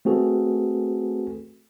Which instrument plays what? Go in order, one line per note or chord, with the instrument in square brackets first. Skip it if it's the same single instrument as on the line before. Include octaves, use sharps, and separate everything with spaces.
[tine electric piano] A3 C4 F#4 G#4 A4 B4